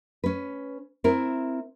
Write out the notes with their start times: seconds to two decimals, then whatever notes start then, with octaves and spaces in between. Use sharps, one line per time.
0.24 C#4 B4
1.04 C4 E4 A#4